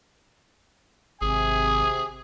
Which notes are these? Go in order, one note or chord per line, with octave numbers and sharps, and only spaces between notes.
G#1 C3 G#4 G#5